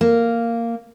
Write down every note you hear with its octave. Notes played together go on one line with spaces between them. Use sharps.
A#3